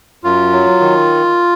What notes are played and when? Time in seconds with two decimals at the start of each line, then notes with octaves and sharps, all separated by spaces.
0.24 F#2 F4
0.52 F#3
0.80 D#3